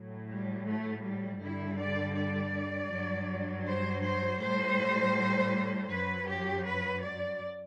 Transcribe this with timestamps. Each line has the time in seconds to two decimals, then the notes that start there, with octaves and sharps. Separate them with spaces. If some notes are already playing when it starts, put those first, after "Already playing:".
Already playing: A2 F#3
0.27 G3
0.65 A3
1.02 G3
1.40 G2 D3 G3 E4
1.77 D5
2.14 D5
2.90 G2 F#3
3.65 C5
4.02 C5
4.40 A2 G3 C5
5.89 F#2 F#3 B4
6.27 G4
6.65 B4
7.01 D5